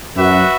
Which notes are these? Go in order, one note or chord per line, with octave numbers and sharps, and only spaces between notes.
F#2 F#4 B4 E5